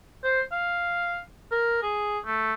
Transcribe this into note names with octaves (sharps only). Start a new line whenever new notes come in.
C5
F5
A#4
G#4
A3